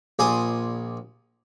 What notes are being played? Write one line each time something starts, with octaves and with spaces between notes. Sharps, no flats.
A#1 D5 G#5 C6 D#6